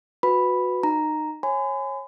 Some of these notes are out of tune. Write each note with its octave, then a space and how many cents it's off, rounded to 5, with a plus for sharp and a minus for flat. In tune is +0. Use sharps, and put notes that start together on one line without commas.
F#4 -20 B4 +10 B5 +0
D#4 -25 A#5 +0
C#5 -25 G#5 +0 B5 +45